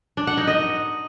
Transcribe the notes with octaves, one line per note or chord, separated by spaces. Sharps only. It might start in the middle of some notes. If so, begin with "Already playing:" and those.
D4
F#5
D#4
D#5